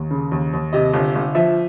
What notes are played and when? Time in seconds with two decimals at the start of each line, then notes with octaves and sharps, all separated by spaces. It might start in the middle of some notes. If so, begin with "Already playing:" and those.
Already playing: D#2
0.11 C#3
0.32 D#2
0.53 D#2
0.73 C3 D#5
0.93 G1
1.15 G1
1.35 F3 E5